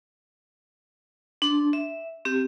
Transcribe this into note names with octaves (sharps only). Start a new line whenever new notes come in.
D4 C6
E5
C4 G4